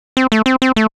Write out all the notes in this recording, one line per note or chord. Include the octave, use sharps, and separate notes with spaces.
C4
A3
C4
C4
A3